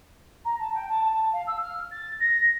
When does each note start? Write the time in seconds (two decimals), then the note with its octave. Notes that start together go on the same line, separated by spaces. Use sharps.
0.45 A#5
0.59 A5
0.74 G5
0.89 A5
1.03 A5
1.33 F5
1.47 E6
1.62 F6
1.91 A6
2.20 A#6